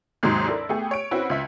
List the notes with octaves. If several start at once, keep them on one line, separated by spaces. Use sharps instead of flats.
D#2 G#2 C3 F#3 G#3
D4 E4 A4 A#4
A3 B3 G4 G#4
C#5 D7
C4 C#4 E4 F#4 B4
C#2 E5 B6